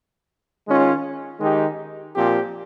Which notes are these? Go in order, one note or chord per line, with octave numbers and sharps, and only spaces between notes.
D#3 G#3 C#4 F4
D#3 G#3 D#4 G4
A#2 F3 C4 G4